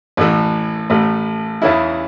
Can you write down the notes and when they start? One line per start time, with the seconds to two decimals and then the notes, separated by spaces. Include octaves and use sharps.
0.17 A1 A2 E3
0.90 A1 A2 A3
1.62 E2 C#3 E3 C#4 E4